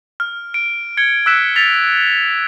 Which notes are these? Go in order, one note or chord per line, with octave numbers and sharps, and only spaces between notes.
F6
D7
G#6 C#7 G7
E6 F#6 B6 E7
A6 B6 F7